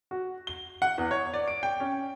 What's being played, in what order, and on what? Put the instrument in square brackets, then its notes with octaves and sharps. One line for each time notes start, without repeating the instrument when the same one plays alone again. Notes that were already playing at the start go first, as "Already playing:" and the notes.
[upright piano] F#4
G7
F#5
E2
C#5
D5
D7
G5
C#4